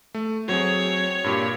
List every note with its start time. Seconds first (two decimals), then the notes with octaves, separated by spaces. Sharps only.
0.14 A3
0.49 F#3 C4 G#4 C#5
1.24 G2 A#2 G4